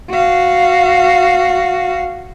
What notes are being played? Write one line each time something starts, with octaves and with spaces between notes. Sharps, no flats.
F#4 F5